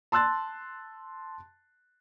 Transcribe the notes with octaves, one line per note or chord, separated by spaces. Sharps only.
A5 C6 E6 F#6 A6